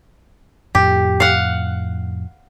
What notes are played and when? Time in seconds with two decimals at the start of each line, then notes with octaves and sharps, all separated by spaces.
0.75 F2 A2 G4
1.20 F5 F#5